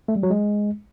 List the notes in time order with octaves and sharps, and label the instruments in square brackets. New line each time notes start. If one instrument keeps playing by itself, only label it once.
[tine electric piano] A3
G3
F#3
G#3